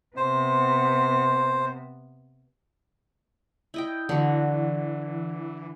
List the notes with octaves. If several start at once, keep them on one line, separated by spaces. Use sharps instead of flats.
C3 B3 C5
E4 D#5 G5
D3 E3 F#4